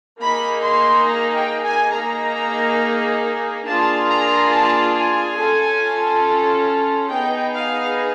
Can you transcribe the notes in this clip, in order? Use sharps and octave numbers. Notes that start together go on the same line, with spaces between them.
A#3 D#4 G#4 B5
C6
A#5
G5
G#5
A#3 D#4 G#4 A#5
A#3 D4 F4 G#4 A5
A#5
A5
G#5
C#4 F4 A4
B3 D#4 G#4 G5
F5